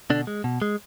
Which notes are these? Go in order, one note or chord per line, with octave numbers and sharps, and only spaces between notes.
B2 D3 D4
G#3
B2
G#3